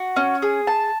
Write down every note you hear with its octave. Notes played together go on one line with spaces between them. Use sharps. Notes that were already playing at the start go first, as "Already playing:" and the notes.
Already playing: F#4
C#4
G#4
A5